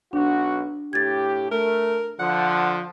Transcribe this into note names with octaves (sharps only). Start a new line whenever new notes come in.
B1 D4 F#4
A2 G4 G#6 A6
A3 A#4
D3 F3 F#5